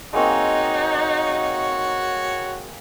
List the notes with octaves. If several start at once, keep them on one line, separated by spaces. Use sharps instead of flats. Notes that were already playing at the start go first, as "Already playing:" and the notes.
G#3 A#3 C4 D#4 F#4 C#5